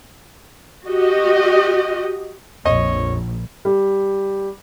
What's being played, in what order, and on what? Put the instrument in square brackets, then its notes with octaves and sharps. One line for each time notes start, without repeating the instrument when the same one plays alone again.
[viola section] F#4 G4 D#5
[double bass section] A#1 [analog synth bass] F2 [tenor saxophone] C#5 [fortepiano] D#5
[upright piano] G3